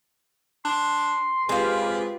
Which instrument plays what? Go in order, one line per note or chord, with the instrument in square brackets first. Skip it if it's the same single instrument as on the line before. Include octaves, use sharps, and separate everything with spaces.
[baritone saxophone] D4 [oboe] C6
[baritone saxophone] G#3 [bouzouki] C4 F5 [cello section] F4 G4 B4